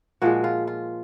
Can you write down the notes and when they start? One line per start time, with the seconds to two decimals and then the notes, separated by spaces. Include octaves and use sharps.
0.22 A#2 F3 G#3 F#4
0.44 F4
0.67 F4